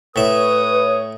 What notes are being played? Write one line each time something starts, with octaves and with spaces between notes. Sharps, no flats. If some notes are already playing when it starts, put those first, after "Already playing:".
A2 B4 C#5 E5 D#6